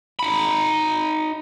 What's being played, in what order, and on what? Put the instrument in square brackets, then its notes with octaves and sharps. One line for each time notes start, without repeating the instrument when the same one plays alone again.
[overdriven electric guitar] D#4 B5